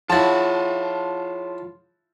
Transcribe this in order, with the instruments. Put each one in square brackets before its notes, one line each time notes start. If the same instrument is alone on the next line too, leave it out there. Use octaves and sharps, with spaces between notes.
[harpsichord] F3 E4 [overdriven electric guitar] F4 F#5 [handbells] G#4 C#5 [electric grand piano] A5 A6